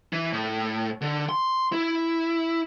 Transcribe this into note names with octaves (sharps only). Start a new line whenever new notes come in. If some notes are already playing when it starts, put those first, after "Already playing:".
E3
A2
D3
C6
E4